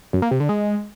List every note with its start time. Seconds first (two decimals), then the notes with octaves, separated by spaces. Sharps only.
0.13 F#2
0.22 A#3
0.31 C3
0.40 D3
0.49 G#3